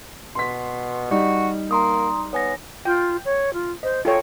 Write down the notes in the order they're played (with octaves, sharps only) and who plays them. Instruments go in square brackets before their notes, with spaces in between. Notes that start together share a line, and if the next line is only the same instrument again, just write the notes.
[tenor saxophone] B2 [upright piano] C6 B6
[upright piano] G3 D#4 [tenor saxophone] F#4
[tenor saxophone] A#3 [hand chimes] A#5 C6 D#6
[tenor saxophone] B3 [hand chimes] C#5 G#5 A#6
[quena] F4 [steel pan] G5
[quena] C#5
F4
[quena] C5 [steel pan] D#5
[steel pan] F4 A4 C#5 [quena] G5